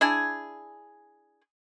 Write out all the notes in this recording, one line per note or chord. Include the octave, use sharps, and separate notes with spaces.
D4 E4 G#4 G#5